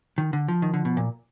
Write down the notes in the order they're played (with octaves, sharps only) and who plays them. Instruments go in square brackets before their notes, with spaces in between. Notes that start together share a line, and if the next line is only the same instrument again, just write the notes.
[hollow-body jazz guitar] D#3
D3
F3
D#3
D3
B2
A#2